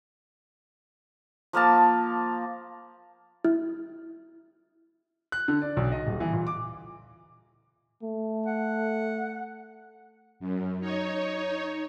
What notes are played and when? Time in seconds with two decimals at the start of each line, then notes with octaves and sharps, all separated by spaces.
1.53 F3 A#3 F5 A5
3.45 E4
5.32 F#6
5.48 D3
5.62 D5
5.77 B1
5.92 D#5
6.07 D#1
6.20 E3
6.33 A#2
6.47 D6
8.03 A3
8.46 F#5
10.40 F#2
10.80 D#4 C#5